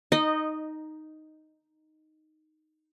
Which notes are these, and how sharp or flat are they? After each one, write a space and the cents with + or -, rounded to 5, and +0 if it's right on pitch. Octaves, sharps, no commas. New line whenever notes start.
D#4 +0 D#5 -15